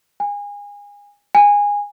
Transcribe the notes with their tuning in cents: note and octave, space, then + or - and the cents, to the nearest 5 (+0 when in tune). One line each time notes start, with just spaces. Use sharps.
G#5 -30
G#5 -20